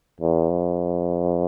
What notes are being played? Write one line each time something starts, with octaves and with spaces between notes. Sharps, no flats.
E2
F2